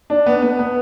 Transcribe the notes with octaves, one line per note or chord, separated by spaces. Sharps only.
D4
B3
B3
B3